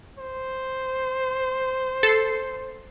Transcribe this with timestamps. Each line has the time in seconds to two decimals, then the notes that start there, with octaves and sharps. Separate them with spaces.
0.19 C5
2.03 A4 C7